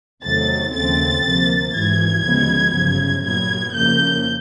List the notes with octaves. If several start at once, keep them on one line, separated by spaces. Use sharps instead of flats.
E2 C3 D#3 F#3 A3 A6
D#2 C#3 F3 A3 C4 A6
D2 C3 F3 A#3
G#1 G#2 E3 G#6
D2 C#3 F3 G#3 B3
G1 F#2 C#3 F3
A#2 F#3 B3 G#6
F2 C#3 F3 A#3 G6